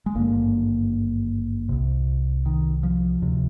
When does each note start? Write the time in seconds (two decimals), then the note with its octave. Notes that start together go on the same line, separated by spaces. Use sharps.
0.06 G#3
0.15 G#1 G2 D3 A#3
1.69 C2 C3
2.46 D#3
2.83 F3
3.22 D2 C3